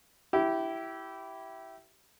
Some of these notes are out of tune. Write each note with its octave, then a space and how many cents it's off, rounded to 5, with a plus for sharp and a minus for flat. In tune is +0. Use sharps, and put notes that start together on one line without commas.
E4 +0 G4 -20